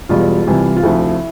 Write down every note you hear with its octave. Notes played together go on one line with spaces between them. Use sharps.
E1 E2 B2 G3 F4
C2 C3 E3 G3
F4
D2 C3 F3 E4